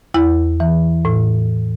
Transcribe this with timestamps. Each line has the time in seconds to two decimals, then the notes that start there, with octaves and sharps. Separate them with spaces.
0.14 E2 E4
0.60 E3
1.05 A2